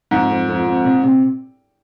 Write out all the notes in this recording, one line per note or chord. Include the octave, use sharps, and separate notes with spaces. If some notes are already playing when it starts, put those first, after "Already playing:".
F2 G#2
F2
F2
F2
C3
C3